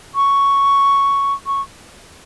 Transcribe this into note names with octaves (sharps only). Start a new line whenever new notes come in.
C#6
C#6